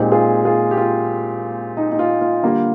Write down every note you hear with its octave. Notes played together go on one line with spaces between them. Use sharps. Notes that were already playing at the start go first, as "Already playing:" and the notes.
Already playing: A#2 G#3 C4 D#4 G4
F4 G#4
F4 G#4
G4
F4
D#4
D#4
F4
F4
D3 G3 A#3